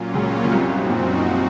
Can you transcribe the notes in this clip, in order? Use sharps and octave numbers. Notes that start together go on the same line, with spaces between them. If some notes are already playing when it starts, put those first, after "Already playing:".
Already playing: A#2 F#3 A#3 C#4 F4
C#2 C#3
C#3
C2 F#2 C3 F3 C4 D#4 F#4
A#2